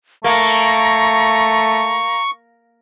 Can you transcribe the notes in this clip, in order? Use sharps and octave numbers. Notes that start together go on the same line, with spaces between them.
A3 A#3 A#5 C#6